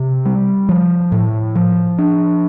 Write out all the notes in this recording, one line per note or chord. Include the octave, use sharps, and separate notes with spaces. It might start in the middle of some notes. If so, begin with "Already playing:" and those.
Already playing: C3
G3
F3
A2
F3
D4